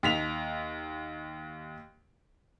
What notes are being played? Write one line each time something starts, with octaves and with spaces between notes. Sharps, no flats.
D#2 B6 F7